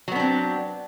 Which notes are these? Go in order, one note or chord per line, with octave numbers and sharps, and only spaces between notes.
F#3 B3 C4 D4